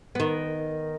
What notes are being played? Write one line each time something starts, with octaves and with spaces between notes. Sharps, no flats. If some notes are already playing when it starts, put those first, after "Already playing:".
D#3 B3